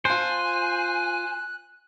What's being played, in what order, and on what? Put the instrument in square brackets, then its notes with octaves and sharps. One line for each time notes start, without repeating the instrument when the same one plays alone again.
[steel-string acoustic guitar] F4 A5 [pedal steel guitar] C5 [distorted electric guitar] G#5 [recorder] F#6